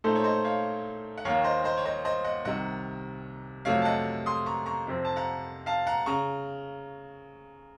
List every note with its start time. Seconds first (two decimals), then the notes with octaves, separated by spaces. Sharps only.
0.04 A#2 A3 D#4 A4 C5
0.16 C#5
0.24 C5 D#5
0.44 C#5 F5
1.18 F#5
1.25 D#2 D#3 A#3 C#5 F5
1.44 C5 D#5
1.64 C5 D#5
1.77 C#5
1.85 C5 D#5
2.05 C5 D#5
2.24 D#5 F#5
2.45 C2 C3 D#3 D#5 F#5
3.65 F2 C3 F#3 A3 C#5 F5
3.82 A5
3.85 D#5 F#5
4.26 C6 D#6
4.46 A#5 C#6
4.66 A#5 C#6
4.87 F2 C3 F3 C4
5.05 A5
5.16 F#5 A#5
5.66 F5 A5
5.87 F#5 A#5
6.06 C#3 A#5 C#6